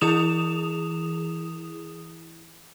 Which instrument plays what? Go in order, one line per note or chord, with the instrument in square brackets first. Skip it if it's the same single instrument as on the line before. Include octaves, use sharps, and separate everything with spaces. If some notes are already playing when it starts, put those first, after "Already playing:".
[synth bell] E3 E4 G#4 D#6 E7 F7